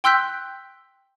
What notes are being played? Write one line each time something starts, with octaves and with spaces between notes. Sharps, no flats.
G5 C6 E6 F#6 G6 B6